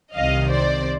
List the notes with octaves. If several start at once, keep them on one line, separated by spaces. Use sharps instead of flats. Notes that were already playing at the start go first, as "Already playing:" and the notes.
C2 C3 D#3 D#5 F5
C5 D5